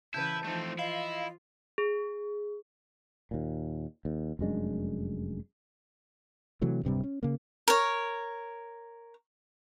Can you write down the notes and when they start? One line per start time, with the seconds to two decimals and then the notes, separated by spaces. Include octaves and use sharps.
0.14 C#3 E3 E4 B4 A5 G6
0.44 E3 F3 A3 C4 D#4
0.79 E4 F4 D#5 F5
1.78 G#4
3.31 D#2 A#2
4.05 D#2
4.39 F1 F#2 G#3 D4
6.61 C3 E3 F#3 A3
6.83 D1 G2 C3 G3
7.04 C#4
7.23 C#3 A#3
7.68 A#4 C#5